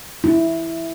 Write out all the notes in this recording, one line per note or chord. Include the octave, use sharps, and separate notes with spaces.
E4